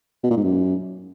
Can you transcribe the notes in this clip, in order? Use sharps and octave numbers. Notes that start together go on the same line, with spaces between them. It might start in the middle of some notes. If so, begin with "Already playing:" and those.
B2
A#2
G#2
F#2